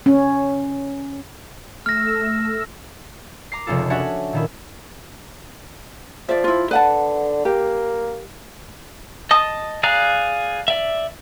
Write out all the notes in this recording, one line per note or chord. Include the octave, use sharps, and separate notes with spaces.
C#4
A3 E6 F6 A#6
A#5 D6 C7
F1 C#2 C#4 F4 A4
C#4 D4 F#4 C#5 E5 F#5
A#2 D#3 E4
F3 D5 E5
E4 F4
D3 B4 F#5 A5
A#3 G4
D#5 A5 D#6
G#4 D5 F5 A#5 F#6
D5 E5